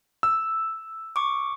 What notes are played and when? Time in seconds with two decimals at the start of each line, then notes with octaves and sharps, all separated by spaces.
0.23 E6
1.16 C#6 D6